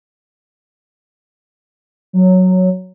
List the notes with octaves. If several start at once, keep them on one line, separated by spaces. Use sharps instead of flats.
F#3